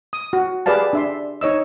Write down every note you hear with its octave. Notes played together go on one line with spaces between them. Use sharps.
D#6
F#4
G4 G#4 B4 D5 F5 A5
D4 E5 C6
D#4 C#5 D#5 E6